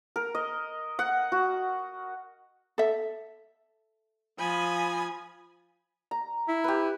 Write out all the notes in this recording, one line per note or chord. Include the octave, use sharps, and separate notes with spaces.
A#4
D#5
F#5
F#4
A4 E5
F3 G#5 B5 D#6
A#5
E4
G4 B4